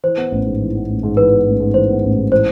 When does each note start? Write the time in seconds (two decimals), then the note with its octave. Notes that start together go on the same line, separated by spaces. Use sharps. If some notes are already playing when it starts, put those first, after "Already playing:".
0.04 E3 C5
0.17 B3
0.32 A1
0.46 G#2
0.61 E3
0.75 B3
0.90 A1
1.03 G#2
1.17 E3 B4
1.32 B3
1.46 A1
1.60 G#2
1.74 E3 C5
1.89 B3
2.03 A1
2.17 G#2
2.31 E3 C5